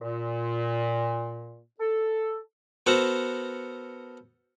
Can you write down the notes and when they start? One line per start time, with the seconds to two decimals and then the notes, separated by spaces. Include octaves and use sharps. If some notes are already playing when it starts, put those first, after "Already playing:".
0.01 A#2
1.80 A4
2.86 B3 F#4 A4 A#4 C5 F#5